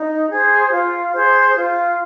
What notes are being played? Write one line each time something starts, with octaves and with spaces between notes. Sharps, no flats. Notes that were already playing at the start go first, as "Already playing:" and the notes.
Already playing: D#4
G#4 C5
F4
G#4 C5
F4